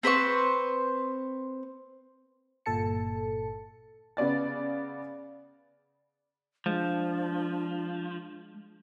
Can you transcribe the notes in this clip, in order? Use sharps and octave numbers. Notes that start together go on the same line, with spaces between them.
C4 B4 C5 C#6
G1 A#2 A4 A5 C#7
C#3 B3 D5 A6
F3 G#3 D4